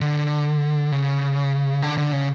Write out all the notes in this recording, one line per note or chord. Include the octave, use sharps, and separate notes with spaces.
D3
C#3
D3
D3
C#3